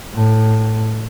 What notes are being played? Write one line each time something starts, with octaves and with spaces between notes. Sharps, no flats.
A2